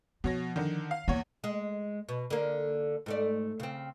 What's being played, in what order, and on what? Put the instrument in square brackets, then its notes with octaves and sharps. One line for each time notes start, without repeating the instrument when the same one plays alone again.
[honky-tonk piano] B2 C#5 A#6 [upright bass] F3
[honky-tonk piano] D3 D#3
F5
[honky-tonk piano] E2 C#5 [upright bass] A#3
[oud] G#3
B2
D3 A#3
G#2 A3 D5
C#3 C4